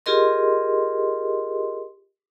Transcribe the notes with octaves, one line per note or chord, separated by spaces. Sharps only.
F4 G4 G#4 A#4 D#5 C6